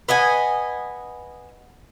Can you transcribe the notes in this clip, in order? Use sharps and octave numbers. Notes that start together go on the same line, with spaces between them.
B4 D#5 F#5 G#5